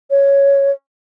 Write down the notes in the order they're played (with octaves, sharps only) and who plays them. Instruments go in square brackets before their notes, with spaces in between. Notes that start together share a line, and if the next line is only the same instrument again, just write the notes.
[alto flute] C#5